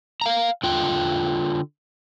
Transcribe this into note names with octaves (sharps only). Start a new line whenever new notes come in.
F5 A#5
D3 F4 G5